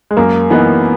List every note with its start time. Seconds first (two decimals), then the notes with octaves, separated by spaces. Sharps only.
0.11 G#3
0.17 F#2 A#3
0.50 E3 A#3 B3 D#4